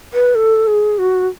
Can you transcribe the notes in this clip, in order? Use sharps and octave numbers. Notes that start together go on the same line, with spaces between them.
B4
A4
G#4
F#4